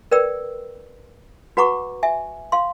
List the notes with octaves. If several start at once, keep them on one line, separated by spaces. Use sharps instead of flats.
A#4 B4 D5 G5 E6
F#4 B4 F#5 A#5 C#6 D6
E5 G#5
F5 C6